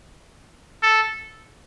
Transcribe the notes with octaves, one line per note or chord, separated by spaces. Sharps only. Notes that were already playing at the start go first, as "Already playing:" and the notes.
A4